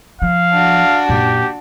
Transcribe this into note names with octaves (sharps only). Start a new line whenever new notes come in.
F3 F5
D4 F#4
F#2 A#2 G4